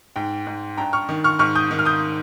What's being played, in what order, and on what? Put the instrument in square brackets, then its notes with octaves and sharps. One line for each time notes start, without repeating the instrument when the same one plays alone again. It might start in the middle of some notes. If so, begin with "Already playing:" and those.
[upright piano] G#2 G5
G#2
G2 G5 A#5
C#6 F6
D#3
C#6 F6
G#2 C#6 F6
D#6 G6
D#3
F6
D#6 G6